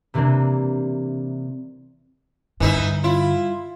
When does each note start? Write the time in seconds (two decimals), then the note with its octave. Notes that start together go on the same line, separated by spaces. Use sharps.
0.14 C3 E3 A#3 C4 D4
2.60 G2 D3 E3 D#4 E5
3.04 E4 F4